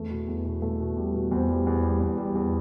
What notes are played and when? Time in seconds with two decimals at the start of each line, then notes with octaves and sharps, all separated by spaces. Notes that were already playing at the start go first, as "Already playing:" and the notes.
Already playing: E2 A3
0.11 B2
0.28 E2
0.45 B2
0.62 B2 A3
0.80 B2
0.96 G3
1.14 B2
1.31 E2 C4
1.49 G3
1.67 E2
1.83 G3
2.00 E2
2.17 G3
2.35 E2